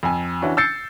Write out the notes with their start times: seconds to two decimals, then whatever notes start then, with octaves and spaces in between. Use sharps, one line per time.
0.03 F2 G#5
0.42 E3 C#4 D4 F#4
0.57 E6 G6 A6 C7 C#7